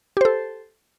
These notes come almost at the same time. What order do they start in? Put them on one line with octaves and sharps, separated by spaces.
G4 C5 A4